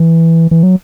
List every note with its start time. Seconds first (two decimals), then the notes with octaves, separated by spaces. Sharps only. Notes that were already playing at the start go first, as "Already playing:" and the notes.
Already playing: E3
0.51 E3
0.63 F#3